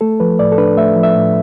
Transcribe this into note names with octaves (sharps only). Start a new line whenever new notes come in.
A3 A4
F3 B4
A2 D5
A4
D4 B4
A3 E5
F3
E5
A2